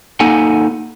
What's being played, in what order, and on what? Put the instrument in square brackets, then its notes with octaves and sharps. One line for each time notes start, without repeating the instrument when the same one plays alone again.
[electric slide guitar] A#3 D#4 A4 F#5 G#5